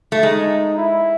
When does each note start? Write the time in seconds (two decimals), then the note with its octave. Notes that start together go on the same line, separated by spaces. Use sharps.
0.12 A3
0.23 G#3 D#4
0.78 E4